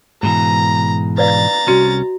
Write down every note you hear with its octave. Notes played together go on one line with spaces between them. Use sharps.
G#2 B2 E3 A#5
B4 D5 F5 A#5 A6
C2 C#4 F#4